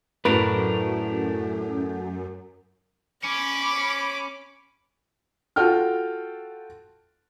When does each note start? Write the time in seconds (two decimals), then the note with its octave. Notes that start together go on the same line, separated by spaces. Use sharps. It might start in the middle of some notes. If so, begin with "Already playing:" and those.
0.25 F#2 A2 A3 D4 F#4 A#4 B4
3.24 C#4 B5 D6
5.56 F4 F#4 A4 G5 F6